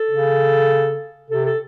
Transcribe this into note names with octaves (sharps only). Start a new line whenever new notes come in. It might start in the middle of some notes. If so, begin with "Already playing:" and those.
Already playing: A4
C#3
C3 A4
A4